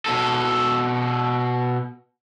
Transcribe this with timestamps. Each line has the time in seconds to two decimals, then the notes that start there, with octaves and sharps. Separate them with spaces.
0.06 B2 A4